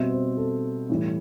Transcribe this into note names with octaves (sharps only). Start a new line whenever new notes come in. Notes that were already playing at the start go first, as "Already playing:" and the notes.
Already playing: B2 G3 C4 E5
C5
A4
A2 E3 G3